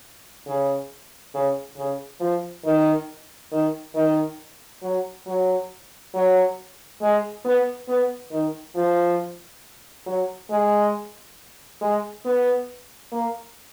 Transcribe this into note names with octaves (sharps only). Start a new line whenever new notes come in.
C#3
C#3
C#3
F3
D#3
D#3
D#3
F#3
F#3
F#3
G#3
B3
B3
D#3
F3
F#3
G#3
G#3
B3
A#3